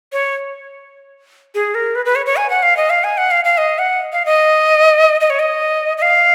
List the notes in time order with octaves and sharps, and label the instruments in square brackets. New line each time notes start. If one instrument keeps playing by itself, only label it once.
[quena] C#5
G#4
A#4
B4
B4
C#5
C#5
G#5
F#5
F5
D#5
F5
G#5
F#5
F5
F5
D#5
F#5
F5
D#5
D#5
C#5
D#5
D#5
F5